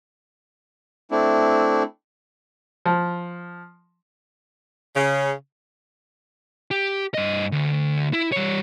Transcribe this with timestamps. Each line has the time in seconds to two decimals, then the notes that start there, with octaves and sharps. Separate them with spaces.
1.11 A3 C4 D4 E4
2.86 F3
4.95 C#3
6.71 G4
7.14 G2 D#5
7.52 D2
8.13 E4
8.32 G3 C#5